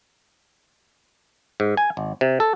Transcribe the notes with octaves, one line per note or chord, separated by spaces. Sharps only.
G#2
G#5
G#1
C3
A4